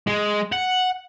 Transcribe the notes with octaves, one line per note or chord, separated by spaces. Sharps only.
G#3
F#5